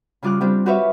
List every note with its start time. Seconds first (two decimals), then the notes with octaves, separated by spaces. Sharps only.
0.23 C#3 G3 F4 D6 F6 F#6
0.41 G3 C4 D4 F4 G4
0.66 F#4 G4 B4 C#5 E5 F5